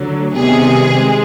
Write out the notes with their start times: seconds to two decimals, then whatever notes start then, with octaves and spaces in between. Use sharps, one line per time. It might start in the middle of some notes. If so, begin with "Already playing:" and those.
Already playing: D2 D3 F#3
0.34 C3 D#3 G3 B3 G#4
0.93 G#3 C4